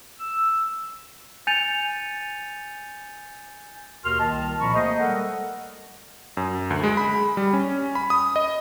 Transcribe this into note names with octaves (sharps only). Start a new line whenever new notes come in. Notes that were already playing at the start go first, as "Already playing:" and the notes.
E6
G#5 G6 A6 C#7 D#7 F7
D#2 B2 F#4 A#4 C6 F6
C2 D#3 A#3 D#5 A5
A#2 F3 C4 A#5 B5 C#6
A3 A#3 G#4 C5 D#5
G3 G#3 A4 A#4 F#5
F#2
D2
G#3
B5
G3
C#4
B5
D#6
D#5